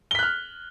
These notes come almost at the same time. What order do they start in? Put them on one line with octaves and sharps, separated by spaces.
G7 B6 F#6 F6